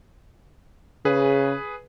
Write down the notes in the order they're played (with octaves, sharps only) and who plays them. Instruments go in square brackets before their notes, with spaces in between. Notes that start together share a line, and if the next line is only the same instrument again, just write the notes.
[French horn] C#3 [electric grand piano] G#4 B4